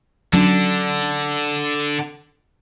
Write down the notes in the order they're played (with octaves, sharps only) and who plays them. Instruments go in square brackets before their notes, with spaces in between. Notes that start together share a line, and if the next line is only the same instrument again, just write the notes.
[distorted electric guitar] D3 [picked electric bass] F#3 C#4 D4